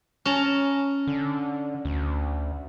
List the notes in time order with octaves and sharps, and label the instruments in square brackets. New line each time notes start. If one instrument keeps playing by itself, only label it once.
[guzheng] C#4 A5 A#5
[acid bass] D3
D2